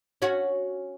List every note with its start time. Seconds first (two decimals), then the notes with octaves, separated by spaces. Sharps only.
0.22 C#4 F#4